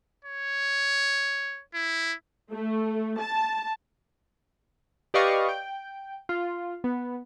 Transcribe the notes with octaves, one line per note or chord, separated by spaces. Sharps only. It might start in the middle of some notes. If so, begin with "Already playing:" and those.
C#5
E4
A3
A5
G4 B4 D5 D#5 F5 C#6
G5
F4
B3